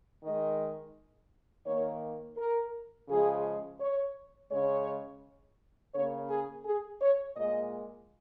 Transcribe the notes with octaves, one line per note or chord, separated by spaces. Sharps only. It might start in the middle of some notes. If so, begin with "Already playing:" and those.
D#3 G#3 D#5
D#3 A#3 C#5
A#4
C#3 F3 G#3 G#4
C#5
C#3 G#3 C#5
C#3 A#3 C#5
G#4
G#4
C#5
A#2 G#3 D#5